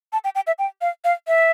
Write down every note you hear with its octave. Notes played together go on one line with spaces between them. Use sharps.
A5
G5
G5
E5
G5
F5
F5
E5